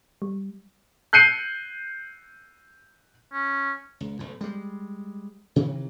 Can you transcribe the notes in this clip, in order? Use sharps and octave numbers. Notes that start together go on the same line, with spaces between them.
G3
F#6 G6 C7 C#7 D#7
C#4
C#2
B1 A2
G3 G#3
C3 D#3 E3